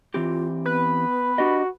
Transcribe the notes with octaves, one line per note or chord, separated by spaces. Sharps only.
E3 C4 F4 G4
B3 B4
D4 F#4 G4 D#5